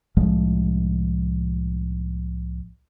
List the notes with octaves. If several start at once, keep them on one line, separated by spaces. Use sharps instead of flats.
C2 A2 F3 G#3